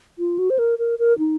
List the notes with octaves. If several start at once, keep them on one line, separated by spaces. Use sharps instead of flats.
F4
F#4
C5
A#4
A#4
A#4
D#4